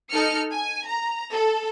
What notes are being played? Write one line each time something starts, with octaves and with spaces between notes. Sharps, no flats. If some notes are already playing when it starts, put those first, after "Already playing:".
D#4 A4 F6 C#7
G#5
A#5
A4